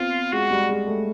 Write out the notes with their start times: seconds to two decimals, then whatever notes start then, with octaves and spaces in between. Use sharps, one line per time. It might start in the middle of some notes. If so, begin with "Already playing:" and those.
Already playing: B3 C4 F4
0.32 G#3 F#4
0.51 G3
0.69 G#3
0.87 A3